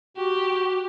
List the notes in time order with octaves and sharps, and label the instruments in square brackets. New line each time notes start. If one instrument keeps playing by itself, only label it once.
[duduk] F#4 [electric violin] G4